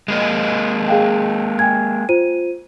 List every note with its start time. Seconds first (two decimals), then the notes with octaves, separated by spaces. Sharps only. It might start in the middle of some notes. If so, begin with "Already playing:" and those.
0.08 G#3 A#3 D#5
0.88 G#4 F5 G5
1.59 G5 G#5 G#6
2.09 F4 C5 D#7